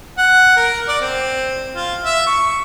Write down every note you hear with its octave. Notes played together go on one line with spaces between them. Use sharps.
F#5
A#4
D5
C4
F4
E5
C#6